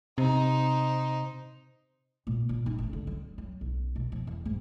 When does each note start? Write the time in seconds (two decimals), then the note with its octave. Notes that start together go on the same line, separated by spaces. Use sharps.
0.18 C3 D#4 C5
2.27 A#2
2.49 A#2
2.66 D#4
2.78 A1
2.93 D3
3.07 F#3
3.38 F#3
3.61 B1
3.96 B2
4.12 F3
4.27 E2
4.45 G#2